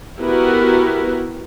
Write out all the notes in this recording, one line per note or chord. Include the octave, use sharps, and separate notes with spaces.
B3 E4 F#4 G4 A#4 B4